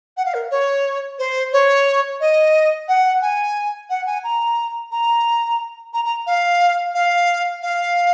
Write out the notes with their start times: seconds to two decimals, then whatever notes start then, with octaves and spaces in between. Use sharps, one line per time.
0.17 F#5
0.25 F5
0.34 A#4
0.51 C#5
1.19 C5
1.53 C#5
2.20 D#5
2.88 F#5
3.22 G#5
3.90 F#5
4.06 G#5
4.24 A#5
4.91 A#5
5.93 A#5
6.05 A#5
6.27 F5
6.95 F5
7.62 F5